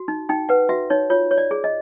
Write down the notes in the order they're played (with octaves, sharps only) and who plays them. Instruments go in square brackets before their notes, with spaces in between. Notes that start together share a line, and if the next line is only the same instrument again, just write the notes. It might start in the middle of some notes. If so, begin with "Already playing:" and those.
Already playing: [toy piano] F#4
D#4
D#4 G5
B4 F#5
F#4 E5
D#4 C#5
F4 C#5
C#5
D5
G#4
D#5